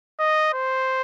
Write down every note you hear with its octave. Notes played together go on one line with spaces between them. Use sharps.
D#5
C5